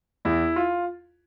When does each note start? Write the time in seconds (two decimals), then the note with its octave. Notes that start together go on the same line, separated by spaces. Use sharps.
0.25 E2 E4
0.56 F4